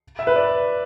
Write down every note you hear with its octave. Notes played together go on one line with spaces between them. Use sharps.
E5
B4
D5